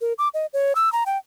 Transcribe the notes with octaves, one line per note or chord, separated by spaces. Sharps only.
A#4
D6
D#5
C#5
E6
A#5
G5